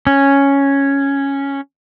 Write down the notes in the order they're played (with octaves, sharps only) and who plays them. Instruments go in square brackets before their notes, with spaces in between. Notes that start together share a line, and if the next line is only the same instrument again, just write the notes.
[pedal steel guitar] C#4